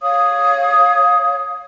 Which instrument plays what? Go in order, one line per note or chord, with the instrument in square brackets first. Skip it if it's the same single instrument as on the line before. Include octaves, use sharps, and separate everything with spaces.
[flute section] C#5 F5 D#6